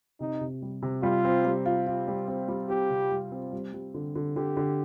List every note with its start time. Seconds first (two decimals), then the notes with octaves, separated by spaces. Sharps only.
0.20 C3 D#4
0.41 C3
0.62 G3
0.82 C3
1.03 G3 F4
1.25 C4
1.45 G3
1.66 F4
1.87 F4
2.08 G3
2.28 C4
2.48 G3
2.69 C4 G4
2.90 C3
3.11 G3
3.32 C4
3.53 G3
3.74 G3
3.94 D3
4.15 D3
4.36 D3 G4
4.57 D3